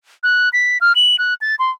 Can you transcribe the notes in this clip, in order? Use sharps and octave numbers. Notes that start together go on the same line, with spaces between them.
F#6
B6
F6
F#7
F#6
A6
C6